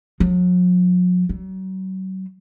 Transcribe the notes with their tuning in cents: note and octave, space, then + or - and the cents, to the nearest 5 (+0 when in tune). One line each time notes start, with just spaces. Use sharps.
F#3 -45
F#3 +35